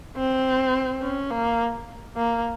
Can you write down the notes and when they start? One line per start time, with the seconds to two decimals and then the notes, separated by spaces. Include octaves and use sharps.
0.17 C4
1.02 C#4
1.31 A#3
2.17 A#3